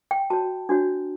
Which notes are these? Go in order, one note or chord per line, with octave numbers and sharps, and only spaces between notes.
G5
F#4 C#5 A5
D4 F#4 C#5